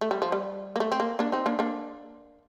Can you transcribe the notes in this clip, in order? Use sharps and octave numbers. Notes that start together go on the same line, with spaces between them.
A3
G3
F3
G3
A#3
A3
C4
A#3
A#3 D4
C4 D#4
A#3 D4
A#3 D4